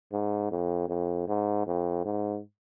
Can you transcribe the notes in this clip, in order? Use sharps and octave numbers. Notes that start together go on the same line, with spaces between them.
G#2
F2
F2
G#2
F2
G#2